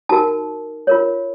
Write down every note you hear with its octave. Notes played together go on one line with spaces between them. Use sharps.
D#4 F#4 A#4 A5
F4 A#4 C#5